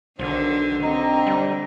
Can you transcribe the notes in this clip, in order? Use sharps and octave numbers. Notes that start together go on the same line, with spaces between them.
B1 D3 D#3 C5
D3 C4 D#5 A#5
G3